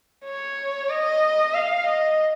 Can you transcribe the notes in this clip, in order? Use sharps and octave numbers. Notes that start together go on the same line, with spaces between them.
C#5
D#5
F5
D#5